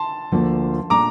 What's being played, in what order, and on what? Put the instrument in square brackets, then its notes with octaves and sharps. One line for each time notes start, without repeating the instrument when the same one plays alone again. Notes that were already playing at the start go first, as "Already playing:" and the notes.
Already playing: [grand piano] A5 C6
[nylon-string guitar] D2 D3 F3 A#3
[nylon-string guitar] A#2 A3 D4 [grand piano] A#5 D6